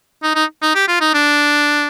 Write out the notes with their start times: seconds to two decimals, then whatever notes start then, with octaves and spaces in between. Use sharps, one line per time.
0.23 D#4
0.35 D#4
0.62 D#4
0.75 G4
0.88 F4
1.01 D#4
1.14 D4